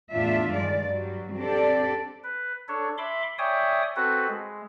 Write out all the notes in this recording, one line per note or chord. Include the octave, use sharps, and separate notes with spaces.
E2 A2 D4 F4 E5
G2 D#3 G#3 D5
G2 F#3 G3
C4 D4 G4 A4 D5
B4
D4 A4 C#5
E5 B5 C6 D6
C#5 D5 E5 G5 G#5 D#6
C4 F#4 A4 B4
G#3